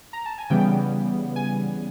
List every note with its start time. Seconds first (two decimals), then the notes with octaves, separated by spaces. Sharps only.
0.13 A#5
0.26 A5
0.38 G#5
0.50 C#3 E3 G3 B3 G5
1.36 G#5